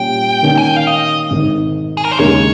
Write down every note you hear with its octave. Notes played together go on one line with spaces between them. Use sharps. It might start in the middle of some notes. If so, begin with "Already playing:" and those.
Already playing: A#2 G3 C#4 G5
D#3 A#3 C#4
G#5
G5
F5
D#5
G#1 G#2 D#3
G#4
A#4
C5
D#2 C#3 G#3 D#4 A#4 C#5